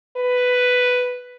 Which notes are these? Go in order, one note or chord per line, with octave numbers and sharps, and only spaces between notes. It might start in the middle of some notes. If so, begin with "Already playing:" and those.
B4